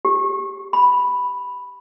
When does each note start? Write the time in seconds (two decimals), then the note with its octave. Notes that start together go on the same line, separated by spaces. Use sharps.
0.05 G4
0.73 B5